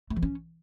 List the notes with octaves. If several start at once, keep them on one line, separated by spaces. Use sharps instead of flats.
A3
E3
C#4